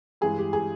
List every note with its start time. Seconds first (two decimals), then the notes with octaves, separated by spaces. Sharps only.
0.21 G2 E3 G#3 G#4
0.38 G4
0.53 G#4